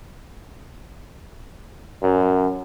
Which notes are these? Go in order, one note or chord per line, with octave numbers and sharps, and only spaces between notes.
F#2